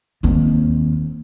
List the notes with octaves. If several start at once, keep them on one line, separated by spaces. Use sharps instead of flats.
D#2 C4